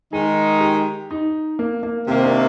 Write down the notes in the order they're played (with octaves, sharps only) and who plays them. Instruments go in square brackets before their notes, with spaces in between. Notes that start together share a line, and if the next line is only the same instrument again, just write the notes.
[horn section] D#3 G#3 D#4 [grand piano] G#4
[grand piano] G4
D#4
A#3
A#3
[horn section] C3 D#3 A#3 [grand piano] C4
[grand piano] D4